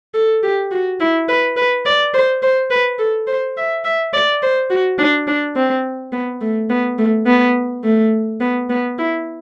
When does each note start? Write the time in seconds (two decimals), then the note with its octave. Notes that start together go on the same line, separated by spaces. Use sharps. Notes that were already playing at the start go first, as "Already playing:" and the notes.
0.14 A4
0.43 G4
0.71 F#4
1.00 E4
1.28 B4
1.57 B4
1.86 D5
2.14 C5
2.42 C5
2.70 B4
2.99 A4
3.27 C5
3.57 E5
3.84 E5
4.13 D5
4.42 C5
4.70 F#4
4.98 D4
5.27 D4
5.56 C4
6.12 B3
6.41 A3
6.70 B3
6.98 A3
7.26 B3
7.84 A3
8.40 B3
8.70 B3
8.98 E4